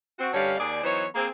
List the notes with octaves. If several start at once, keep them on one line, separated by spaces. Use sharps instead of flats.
C4 F#4
G2 D3 G3 C#4 C#5 F5
D#2 G#4 D5
E3 F#3 B3 D#4 C5 C#5
A#3 C4 G#4